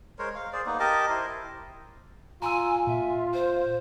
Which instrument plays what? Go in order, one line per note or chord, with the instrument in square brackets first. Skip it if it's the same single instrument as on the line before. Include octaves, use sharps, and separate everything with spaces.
[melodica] G#3 A#4 C5 C#5
F5
G#4 C5 D5
A#3 B3 D#4
G4 A#4 D#5 A5
E4 C5
[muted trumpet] F4 [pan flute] G#5 [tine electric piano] A#5 C6 E6
[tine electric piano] A#2 [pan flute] E5
[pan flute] C5